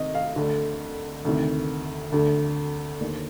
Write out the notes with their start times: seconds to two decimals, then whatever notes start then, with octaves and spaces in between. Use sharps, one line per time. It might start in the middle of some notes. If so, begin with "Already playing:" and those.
Already playing: C3 D#3 D#5
0.15 F5
0.36 D2 D3
1.25 D2 C3 D#3
2.12 D2 D3
3.00 D#2 D3